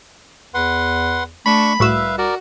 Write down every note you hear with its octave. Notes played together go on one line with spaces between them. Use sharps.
E2 B4 F#5 C6
A3 D4 B5 C#6
C2 A2 F#4 B4 E5 F5 E6
F#4 A#4 D5